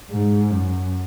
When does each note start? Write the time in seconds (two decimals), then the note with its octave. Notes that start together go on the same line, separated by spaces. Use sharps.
0.11 G#2
0.51 F#2